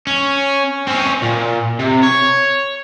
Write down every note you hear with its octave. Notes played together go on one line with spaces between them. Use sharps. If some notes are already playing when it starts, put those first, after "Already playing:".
C#4
C4 C#4
A#2
C3
C#5